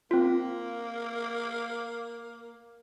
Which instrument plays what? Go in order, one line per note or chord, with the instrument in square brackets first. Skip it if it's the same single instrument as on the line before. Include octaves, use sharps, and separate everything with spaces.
[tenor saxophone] A#3 [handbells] C4 F4